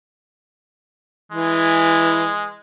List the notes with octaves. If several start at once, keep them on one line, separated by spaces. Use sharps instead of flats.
E3 G#3